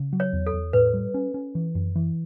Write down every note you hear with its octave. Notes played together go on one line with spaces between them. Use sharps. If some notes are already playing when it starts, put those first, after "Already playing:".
Already playing: C#3
F#3
C#5
E2
A4
E2
A2 B4
G3
C#4
C#4
E3
F#2
E3